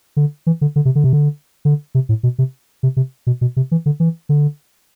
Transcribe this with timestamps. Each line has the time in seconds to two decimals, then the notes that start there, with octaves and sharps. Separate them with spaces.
0.17 D3
0.47 E3
0.61 D3
0.76 D3
0.85 C3
0.95 D3
1.04 C3
1.13 D3
1.65 D3
1.95 C3
2.09 A2
2.23 B2
2.39 C3
2.83 C3
2.97 C3
3.27 B2
3.41 B2
3.57 C3
3.71 E3
3.86 D3
4.00 E3
4.29 D3